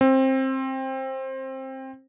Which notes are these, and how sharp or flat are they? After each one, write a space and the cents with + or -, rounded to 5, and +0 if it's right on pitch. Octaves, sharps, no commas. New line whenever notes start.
C4 +20